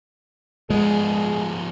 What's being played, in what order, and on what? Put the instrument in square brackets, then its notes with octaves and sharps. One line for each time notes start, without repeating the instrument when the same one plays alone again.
[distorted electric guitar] F3 B3 [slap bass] G#3 [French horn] G#4